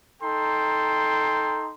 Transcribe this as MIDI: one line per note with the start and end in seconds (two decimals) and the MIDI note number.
0.22 1.73 63
0.22 1.73 69
0.22 1.73 79
0.22 1.73 82
0.22 1.73 84